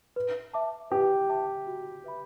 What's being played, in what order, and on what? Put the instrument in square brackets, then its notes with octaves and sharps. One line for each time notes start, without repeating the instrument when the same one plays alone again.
[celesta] B4
E5 A5 D6
[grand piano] G4 [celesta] B4
[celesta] E5 A5 D6
F#4
B4 E5 B5